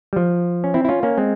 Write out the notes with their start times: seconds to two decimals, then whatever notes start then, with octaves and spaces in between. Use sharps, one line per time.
0.13 G3
0.16 F3
0.64 C#4
0.74 C4 E4
0.85 E4
0.89 C#4 F4
1.03 A#3 C#4
1.18 G#3 C4